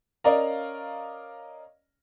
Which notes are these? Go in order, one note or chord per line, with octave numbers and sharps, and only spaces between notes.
C#4 A#4 D5 D#5 F5 A#5